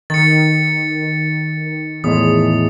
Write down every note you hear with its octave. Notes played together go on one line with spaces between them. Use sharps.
D#3 A6 C#7
E2 A2 G#3 D#6